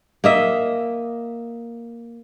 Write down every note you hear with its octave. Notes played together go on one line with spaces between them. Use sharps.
A#3 D#5 E5